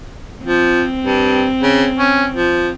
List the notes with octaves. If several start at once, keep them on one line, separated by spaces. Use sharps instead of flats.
F3 C4
G2
C#3
C#4
F3